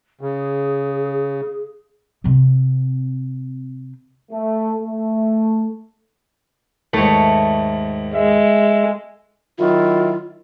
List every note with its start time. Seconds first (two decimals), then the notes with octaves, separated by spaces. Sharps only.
0.21 C#3 G#4
2.24 C3 C4
4.31 A3
4.82 A3
6.93 D#2 G#2 A3 C#5
8.15 G#3 E5
9.58 D#3 F#3 E4 F4